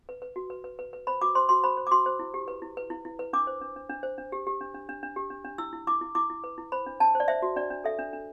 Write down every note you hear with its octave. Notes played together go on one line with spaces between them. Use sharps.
B4
B4
F#4
B4
B4
B4
B4
C5 B5
F#4 D6
C5 C6
F#4 C6
C5 B5
C5
D6
F#4 C6
C5
E4
G4
B4
E4
B4
E4
E4
B4
D4 D6
C5
D4
D4
D4
C5
D4
G4
G4
D4
D4
D4
D4
G4
D4
D4
E4 E6
E4
E4 D6
E4
E4 D6
E4
B4
E4
C5 B5
D4
D4 A5
C5
D5
C5 E5
F#4
D4 D5
D4
A4 E5
D4
D4